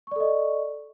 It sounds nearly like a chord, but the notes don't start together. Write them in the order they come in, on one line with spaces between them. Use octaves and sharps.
C#6 D5 A4 D#5